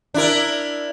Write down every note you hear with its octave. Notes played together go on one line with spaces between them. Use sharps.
D4 E4 A#4